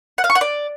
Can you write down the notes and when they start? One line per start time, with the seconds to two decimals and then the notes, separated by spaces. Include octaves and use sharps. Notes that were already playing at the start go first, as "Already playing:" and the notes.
0.18 F#5
0.24 F5
0.30 C#6
0.35 F#5
0.41 D5